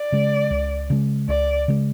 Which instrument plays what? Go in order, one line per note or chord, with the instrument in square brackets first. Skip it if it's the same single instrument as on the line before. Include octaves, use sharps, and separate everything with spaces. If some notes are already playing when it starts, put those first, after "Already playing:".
Already playing: [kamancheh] D5
[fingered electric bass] C#3 G#3
C#2
C#3 G#3
[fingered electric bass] C#2 [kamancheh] D5
[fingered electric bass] C#3 G#3